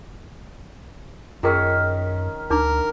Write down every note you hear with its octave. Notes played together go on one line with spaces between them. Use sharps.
F#2 D#3 C#4 F4 G#4 A#4 C#6
D2 D4 D#4 A#4 D6